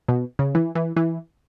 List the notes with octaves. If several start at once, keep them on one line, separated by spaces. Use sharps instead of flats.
B2
C#3
E3
E3
E3